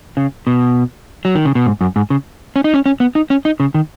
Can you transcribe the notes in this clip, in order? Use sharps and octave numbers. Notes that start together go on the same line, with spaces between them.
C#3
B2
F#3
D#3
C#3
B2
G#2
F#2
G#2
C#3
C#4
D#4
C#4
C#4
B3
D#4
C#4
D#4
C#3
D#3